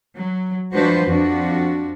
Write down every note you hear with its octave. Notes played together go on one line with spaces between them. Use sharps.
F#3
F3 G#3 D4 F#4 B4 C5
F2 F3 D4 F#4